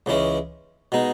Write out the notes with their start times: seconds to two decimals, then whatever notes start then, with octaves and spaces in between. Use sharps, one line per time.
0.06 C#2 C#3 E3 G#3 C#4
0.92 B2 G#3 D#4